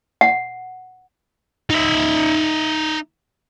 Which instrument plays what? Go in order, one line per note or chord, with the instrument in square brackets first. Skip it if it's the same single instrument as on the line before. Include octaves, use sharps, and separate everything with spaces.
[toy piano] F#5
[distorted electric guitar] D#4 E5